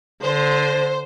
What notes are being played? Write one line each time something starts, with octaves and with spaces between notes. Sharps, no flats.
D3 C5